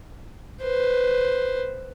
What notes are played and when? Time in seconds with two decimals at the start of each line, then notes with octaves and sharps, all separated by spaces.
0.62 B4 C5